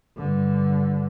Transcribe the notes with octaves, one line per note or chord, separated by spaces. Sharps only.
G2 D3